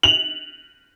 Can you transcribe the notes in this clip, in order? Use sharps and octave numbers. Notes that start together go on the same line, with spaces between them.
F7 F#7